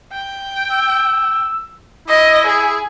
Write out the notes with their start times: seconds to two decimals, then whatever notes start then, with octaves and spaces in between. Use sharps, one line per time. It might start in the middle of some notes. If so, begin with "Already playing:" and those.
0.13 G5
0.71 E6
2.08 E4 D#5
2.46 G#4